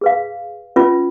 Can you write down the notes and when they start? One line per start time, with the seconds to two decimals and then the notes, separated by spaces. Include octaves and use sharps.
0.01 G#4 B4 F5
0.76 C#4 F4 B4